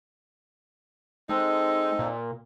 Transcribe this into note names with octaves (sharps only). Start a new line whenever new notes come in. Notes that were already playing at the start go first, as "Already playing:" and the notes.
G#3 C4 D#4 A4
A#2